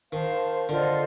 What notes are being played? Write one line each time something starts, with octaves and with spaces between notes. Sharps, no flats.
D#3 C5 F5 A5
D3 F4 A4 C5 D#5